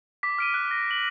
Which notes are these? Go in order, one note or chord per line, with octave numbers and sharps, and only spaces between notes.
D6 B6
F6 D7 D#7
F#6
A#6
F#7